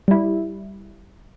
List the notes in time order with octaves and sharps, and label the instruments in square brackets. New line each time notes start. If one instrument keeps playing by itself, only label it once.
[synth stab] G3 E4